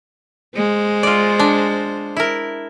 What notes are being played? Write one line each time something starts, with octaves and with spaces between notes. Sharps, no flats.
G#3 C5
F4 D5
D4
E4 A#4